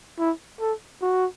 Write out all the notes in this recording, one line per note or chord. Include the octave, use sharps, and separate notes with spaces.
E4
A4
F#4